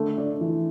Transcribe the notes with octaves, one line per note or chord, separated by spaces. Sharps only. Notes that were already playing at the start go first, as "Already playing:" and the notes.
Already playing: D3 A3
D4
E3